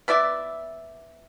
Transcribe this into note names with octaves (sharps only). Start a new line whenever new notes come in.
B3 E4 D5 E5